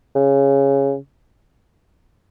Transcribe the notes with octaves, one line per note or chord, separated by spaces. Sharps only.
C#3